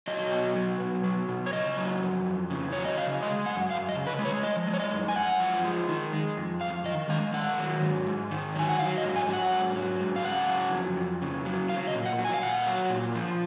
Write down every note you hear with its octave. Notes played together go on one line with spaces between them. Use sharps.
F#3 D#5
B2
F#3
B2
F#3
B2
C#5
C#3 D#5
F#3
F2
F2
C#3
F#3 C#5
D#5
C#3 F5
G#3 D#5
F#2 F#5
F#2 F5
D#5
C#3
B4
G#3
C#5
F3 D#5
G#3
C#5
D#5
F#2
G#5
F#2 F#5
F3
G#3
D#3
G#3
F2
F2 F5
D#3 D#5
G#3 F5
D#3 F#5
F#3
G#2
G#2
D#3
F#3 G#5
F#5
F#3 F5
D#5
G#2
G#5
F#3
F#5
G#2
F#3
G#2
F5
C#3 F#5
F#3
F2
F2
C#3
F#3
F#3 F5
D#5
A#2
F#5
F#3
G#5
F5
A#2 F#5
F#3
A#2
F3